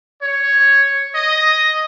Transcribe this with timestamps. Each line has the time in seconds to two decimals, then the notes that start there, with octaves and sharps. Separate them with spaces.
0.22 C#5
1.14 D#5